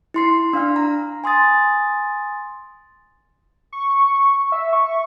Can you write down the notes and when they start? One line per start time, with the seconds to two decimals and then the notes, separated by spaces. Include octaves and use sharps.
0.14 E4 C6 C7
0.53 D4 F5 F6
0.76 A#5
1.24 G#5 C6 D#6 A6
3.73 C#6
4.52 E5
4.73 C#6